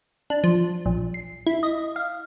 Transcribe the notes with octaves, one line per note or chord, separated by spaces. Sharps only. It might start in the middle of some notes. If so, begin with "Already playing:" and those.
D4
F3
A#1
C7
E4
D#5
F5